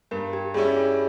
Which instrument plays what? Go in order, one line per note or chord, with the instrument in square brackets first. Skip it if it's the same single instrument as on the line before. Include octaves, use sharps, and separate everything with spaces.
[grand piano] G2 [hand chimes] A#4
[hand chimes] G4
[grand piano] G3 C#4 E4 [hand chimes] G#4
[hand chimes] G#4
G#4